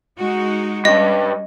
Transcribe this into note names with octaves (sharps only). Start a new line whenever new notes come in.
G#3 D#4 F#4
G2 G3 C#4 D#5